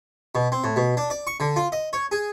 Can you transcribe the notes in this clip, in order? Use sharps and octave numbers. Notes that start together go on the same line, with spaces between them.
B2
C4
A2
B2
D4
D5
C#6
D3
F4
D#5
C#5
G#4